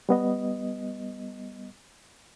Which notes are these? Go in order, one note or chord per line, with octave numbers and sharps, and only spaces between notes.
G3 B3 D#5